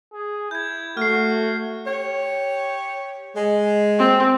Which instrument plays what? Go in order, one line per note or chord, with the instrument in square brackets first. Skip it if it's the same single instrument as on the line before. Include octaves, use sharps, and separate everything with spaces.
[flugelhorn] G#4
[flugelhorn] E4 [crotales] G6 G#6
[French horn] A3 [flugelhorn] F#4 [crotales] F6 C7
[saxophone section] G4 C#5
G#3
[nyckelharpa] C4